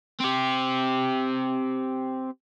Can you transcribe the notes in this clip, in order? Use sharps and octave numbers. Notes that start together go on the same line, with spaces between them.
C4 G4